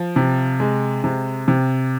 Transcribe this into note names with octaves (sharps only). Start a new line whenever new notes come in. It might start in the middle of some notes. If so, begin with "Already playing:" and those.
Already playing: F3
C3
G#3
C3
C3